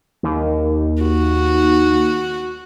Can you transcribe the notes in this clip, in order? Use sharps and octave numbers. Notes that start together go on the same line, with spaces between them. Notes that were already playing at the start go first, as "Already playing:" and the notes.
D#2
F#4